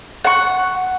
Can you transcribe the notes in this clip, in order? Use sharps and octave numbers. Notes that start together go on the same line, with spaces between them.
F#5 C#6